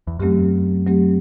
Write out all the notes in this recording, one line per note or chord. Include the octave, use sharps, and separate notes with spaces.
E2
F#2 F#3 A3 C4 G4
F#3 A3 C4 G4